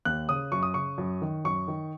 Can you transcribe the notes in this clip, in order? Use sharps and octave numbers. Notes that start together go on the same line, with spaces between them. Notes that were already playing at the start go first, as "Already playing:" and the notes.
D#2 F#6
C#3 D#6
F#2 C#6
D#6
C#3 C#6
F#2
D#3
F#2 C#6
D#3